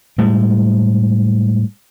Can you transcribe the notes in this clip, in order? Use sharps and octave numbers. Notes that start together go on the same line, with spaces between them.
A2 G3 G#3